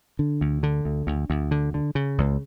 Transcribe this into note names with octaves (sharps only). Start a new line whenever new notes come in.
D3
D2
D3
D2
D2
D2
D3
D3
C#3
C#2